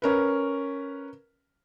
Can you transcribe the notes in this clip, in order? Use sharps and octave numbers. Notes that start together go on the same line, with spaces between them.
C#4 A#4 B4